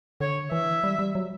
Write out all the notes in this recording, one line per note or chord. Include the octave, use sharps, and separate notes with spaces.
D3 C#5
E3 E5
G3
G3
F#3